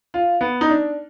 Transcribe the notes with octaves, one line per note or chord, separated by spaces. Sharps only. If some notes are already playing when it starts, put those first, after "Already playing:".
F4
B3
D#4
D4